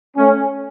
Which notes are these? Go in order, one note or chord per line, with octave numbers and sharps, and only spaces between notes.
A3 C#4